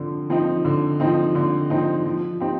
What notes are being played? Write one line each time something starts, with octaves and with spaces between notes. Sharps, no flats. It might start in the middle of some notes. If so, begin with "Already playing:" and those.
Already playing: D3 F3 C4
F3 C4 D#4
D3
F3 C4 D#4
D3
F3 C4 D#4
F3
C4 D#4 G4